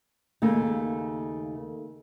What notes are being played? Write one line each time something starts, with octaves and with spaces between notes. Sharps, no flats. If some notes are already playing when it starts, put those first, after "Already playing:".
D#2 C#3 A3 A#3